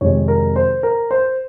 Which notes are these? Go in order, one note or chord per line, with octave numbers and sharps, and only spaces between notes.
F2 C3 D#3 G#3 C#5
A#4
C5
A#4
C5